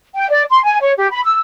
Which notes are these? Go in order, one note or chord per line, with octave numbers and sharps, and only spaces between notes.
G5
D5
C6
G#5
C#5
G4
B5
E6